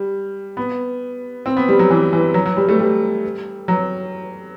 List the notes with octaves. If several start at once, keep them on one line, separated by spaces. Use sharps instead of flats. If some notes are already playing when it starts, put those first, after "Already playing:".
Already playing: G3
B3
C4
B3
G3
F#3
E3
E3
F#3
F#3
G3
A3
G3
F#3